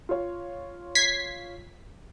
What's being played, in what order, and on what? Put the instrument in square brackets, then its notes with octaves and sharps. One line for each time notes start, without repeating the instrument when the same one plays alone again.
[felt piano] F4 C#5
[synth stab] G#6 B6 C7